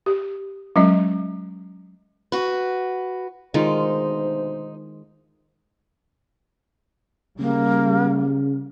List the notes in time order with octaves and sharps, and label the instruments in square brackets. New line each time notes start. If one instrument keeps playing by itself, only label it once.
[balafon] G4
F#3 G#3 C#4 D#5
[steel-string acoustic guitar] F#4 B4
[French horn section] D2 B2 C5 [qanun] D#3 G#3 F4 [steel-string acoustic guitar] D#4
[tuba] C#3 [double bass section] G3 [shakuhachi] A#3